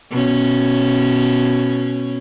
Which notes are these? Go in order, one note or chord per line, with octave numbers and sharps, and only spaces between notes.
B2 C#4